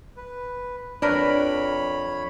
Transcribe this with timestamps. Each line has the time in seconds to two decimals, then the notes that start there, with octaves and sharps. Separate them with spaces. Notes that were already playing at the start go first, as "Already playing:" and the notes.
0.17 B4
1.02 F2 D4 A#4 B4 C#5 B5